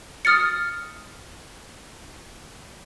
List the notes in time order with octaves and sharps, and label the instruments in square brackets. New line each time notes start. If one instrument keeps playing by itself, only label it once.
[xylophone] D#6 F6 A6 C#7